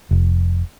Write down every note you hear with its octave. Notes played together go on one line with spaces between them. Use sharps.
F1